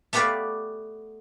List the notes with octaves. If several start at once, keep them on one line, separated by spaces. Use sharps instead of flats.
A3 B3 G4 B4 D5 F5